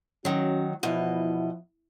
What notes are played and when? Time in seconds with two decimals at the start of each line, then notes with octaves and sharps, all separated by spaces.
0.25 D#3 F#3 C#4 F#4
0.83 E2 B2 F3 E4 D#5